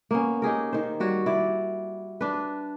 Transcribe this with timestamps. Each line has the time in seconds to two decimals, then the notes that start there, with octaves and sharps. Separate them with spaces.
0.11 A#3 B3 C#4
0.42 D#4 G4 G#4 A#4
0.73 D#3 C5
1.00 G3 F#4 C#5
1.26 E4 D5
2.21 D4 B4